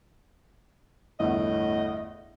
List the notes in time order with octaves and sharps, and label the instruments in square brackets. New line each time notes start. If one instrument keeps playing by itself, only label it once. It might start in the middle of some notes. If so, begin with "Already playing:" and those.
[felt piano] G1 E2 [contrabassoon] A2 [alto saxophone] D#5